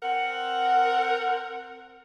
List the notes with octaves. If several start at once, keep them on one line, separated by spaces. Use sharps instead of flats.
C4 A#4 F#5